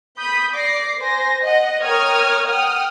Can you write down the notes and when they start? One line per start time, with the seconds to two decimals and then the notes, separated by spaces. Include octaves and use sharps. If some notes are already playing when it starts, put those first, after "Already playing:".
0.19 B5 D#6 G6 B6
0.53 D5 D6 A#6 C7
1.00 C5 G#5 A#6
1.43 D#5 F#5
1.82 A#4 C#5 G5 D#6 F6 G#6
2.46 F#5 G5 D#6 F6